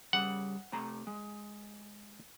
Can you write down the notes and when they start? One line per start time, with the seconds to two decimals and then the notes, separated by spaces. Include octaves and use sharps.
0.13 C#3 G3 F#5
0.72 C3 A3 A#5
1.07 G#3